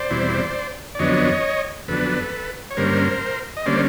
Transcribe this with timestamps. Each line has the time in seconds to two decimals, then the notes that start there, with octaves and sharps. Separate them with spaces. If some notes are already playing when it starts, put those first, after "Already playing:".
Already playing: C5 D5
0.10 E2 B2 G3 C4 E4
0.95 D5
0.99 F2 D3 F#3 B3 D4 C#5 D#5
1.88 F2 D3 F#3 B3 D4 A4 B4
2.71 C#5
2.77 G2 D3 G3 A#3 C#4 A#4 C5
3.57 D#5
3.66 D3 G3 A#3 C#4 C5 D5